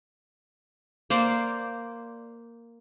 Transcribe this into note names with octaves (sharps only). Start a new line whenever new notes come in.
A#3 C5 D5